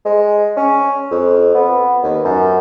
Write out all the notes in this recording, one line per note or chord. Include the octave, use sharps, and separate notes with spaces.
G#3
C#4
F2
B3
D#2
F#2